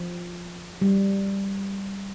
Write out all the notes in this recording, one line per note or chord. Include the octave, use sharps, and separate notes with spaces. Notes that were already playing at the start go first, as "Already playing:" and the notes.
Already playing: F3
G3